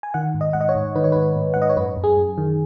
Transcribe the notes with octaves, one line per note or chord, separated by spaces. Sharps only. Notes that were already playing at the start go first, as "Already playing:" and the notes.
G#5
D#3 F#5
G#2
D#5
G#2 F#5
D#5
C#5
G#2
D#3 B4
C#5
G#2 B4
G#2
G#2 F#5
D#5
C#5
F#2 B4
F#2
G#4
F#2
D#3